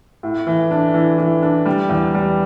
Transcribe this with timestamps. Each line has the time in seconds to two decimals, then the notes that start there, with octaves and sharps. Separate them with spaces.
0.23 A2
0.47 E3
0.71 D4
0.94 E3
1.18 E3
1.42 D4
1.66 G3
1.89 E2
2.15 G3